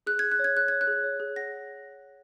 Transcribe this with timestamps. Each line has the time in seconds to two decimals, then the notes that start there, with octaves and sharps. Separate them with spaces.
0.07 G#4 F#6
0.19 G#4 G#6
0.32 F#6
0.39 C#5
0.44 G#6
0.56 G#4 F#6
0.68 C#5 G#6
0.81 F#6
0.87 G#4
1.04 C#5
1.20 G#4
1.36 F#5 A#6